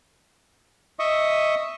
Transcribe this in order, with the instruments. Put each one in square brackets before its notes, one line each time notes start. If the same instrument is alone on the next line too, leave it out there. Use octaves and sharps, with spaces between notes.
[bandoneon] D#5 E5 C#6 D#6